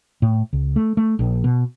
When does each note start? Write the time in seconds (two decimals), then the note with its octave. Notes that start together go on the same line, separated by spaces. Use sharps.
0.22 A2
0.53 C#2
0.76 A3
0.97 A3
1.19 A#1
1.44 B2